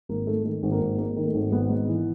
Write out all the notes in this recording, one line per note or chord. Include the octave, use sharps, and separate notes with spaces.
G#1 A#3
G#2 A3
D#3 A3
G#1
A#3
G#1
G#2 A#3
D#3
A3
G#1
G#1 B3
G#2
E3